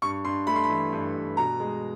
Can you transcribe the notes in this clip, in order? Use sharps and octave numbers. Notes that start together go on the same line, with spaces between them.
G2 C#6
G2 C6
A3 B5
C6
B5
E3
G2
G2
B2 A#5
G#3